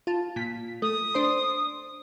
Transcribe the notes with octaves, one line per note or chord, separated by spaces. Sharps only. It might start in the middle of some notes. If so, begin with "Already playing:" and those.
F4 A5
A#2 B6
A3 D#6
D4 C5 C6